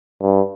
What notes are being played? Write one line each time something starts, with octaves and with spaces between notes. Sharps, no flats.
G2